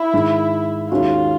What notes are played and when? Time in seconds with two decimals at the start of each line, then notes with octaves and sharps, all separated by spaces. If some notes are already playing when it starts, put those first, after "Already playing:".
Already playing: E4
0.13 G#2 D#3 G#3
0.91 D#2 D#3 G#3 C#4 F4 F#4